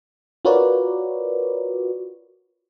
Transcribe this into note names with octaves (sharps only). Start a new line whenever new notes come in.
F4 F#4 A#4 B4 C#5 D5